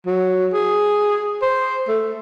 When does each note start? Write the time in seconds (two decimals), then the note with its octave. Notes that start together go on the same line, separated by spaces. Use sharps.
0.06 F#3
0.54 G#4
1.42 C5
1.88 A3